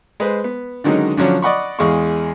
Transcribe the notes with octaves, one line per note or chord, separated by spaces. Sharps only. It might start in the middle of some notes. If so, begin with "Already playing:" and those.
G#3 B4 C5
B3
D3 D#3 F#3 G#3 C#4 D#4
D3 F3 F#3 C#4 D4
D5 D#5 F#5 B5 C#6
E2 G#3 G#4 F5 C#6